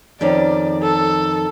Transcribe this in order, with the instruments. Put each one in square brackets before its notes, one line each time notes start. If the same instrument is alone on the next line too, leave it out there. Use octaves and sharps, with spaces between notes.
[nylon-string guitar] F2 D#3 C#4 [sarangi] D5
[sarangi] A4